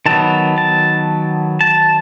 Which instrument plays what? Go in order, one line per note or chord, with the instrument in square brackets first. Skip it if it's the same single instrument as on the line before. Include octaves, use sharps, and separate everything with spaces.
[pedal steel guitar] D#3 F#3 B3 A5
A5
A5